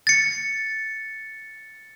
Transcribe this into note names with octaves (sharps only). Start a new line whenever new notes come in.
A6 C#7